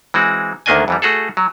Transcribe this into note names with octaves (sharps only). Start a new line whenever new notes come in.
E3 G#3 C4 F#4
D2 D#3 A#3 D4 D#5 G#5
F2 E3 G3
A3 F#4 G#4 A4
F#3